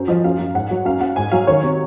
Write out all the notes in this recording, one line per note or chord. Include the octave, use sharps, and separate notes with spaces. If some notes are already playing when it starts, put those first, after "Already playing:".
Already playing: F#2 F#3 C5
F3 D#5
F#2 F5
F#2
G#2 F#5
F#3
F#2 F5
F#2 F#5
G#2 G#5
F#3 F5
D#3 C#5
C3